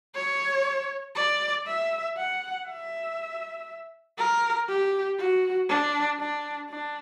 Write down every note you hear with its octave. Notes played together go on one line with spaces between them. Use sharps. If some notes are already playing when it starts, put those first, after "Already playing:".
C#5
D5
E5
F#5
E5
A#4
G4
F#4
D4
D4
D4